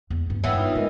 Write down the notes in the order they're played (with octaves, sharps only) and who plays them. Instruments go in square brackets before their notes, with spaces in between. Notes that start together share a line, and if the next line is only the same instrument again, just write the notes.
[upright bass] E2
G2 F4
[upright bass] G2 [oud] E3 B3 [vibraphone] C#5 F#5 G5
[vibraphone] D#4 F4
[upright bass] G#3 [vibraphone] A#4 D#5